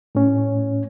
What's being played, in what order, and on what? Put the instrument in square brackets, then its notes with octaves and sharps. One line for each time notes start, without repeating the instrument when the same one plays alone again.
[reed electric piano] A2 C#4